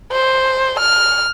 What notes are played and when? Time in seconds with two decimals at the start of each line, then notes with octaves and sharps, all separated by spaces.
0.12 C5
0.79 F6